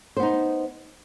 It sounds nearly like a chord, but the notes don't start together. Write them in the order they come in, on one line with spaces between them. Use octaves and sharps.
C5 B3 D#4